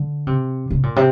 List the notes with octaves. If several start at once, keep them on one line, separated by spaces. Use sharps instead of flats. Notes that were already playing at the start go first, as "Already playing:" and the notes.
Already playing: D3
C3
C3
A#2
C3